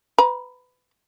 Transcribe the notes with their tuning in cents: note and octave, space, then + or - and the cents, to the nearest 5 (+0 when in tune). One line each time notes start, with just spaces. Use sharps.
B4 +20 A#5 +35